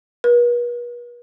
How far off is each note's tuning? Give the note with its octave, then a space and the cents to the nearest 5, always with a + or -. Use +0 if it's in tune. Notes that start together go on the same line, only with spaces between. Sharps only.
B4 -45